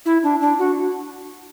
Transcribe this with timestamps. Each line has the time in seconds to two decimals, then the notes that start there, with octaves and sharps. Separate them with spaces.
0.06 E4
0.23 D4
0.41 D4
0.59 F#4